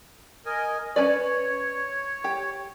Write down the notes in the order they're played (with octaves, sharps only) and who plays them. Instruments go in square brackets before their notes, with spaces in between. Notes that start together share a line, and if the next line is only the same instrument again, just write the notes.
[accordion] A#4 D#5 G#5
[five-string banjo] C#4 B4 D5 [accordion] C#5
[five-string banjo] G4